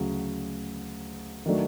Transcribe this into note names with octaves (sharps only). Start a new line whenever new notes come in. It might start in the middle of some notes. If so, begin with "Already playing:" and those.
Already playing: D2 C#3 F#3
D#3 F#3 A3 D4